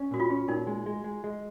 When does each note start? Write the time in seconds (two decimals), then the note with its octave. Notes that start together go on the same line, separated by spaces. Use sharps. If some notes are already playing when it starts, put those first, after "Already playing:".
Already playing: C#4
0.11 A#2 F#4
0.20 F4
0.30 C#4
0.48 A#2 D#4
0.67 G#3
0.86 G#3
1.04 G#3
1.24 G#3